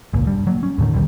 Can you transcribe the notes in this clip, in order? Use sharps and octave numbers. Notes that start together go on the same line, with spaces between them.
G#1 C#2 A#2
G2 G3
F#3 A#3
C#4
D#2 A2 D3 D#3
A#1 D#2 B2 G3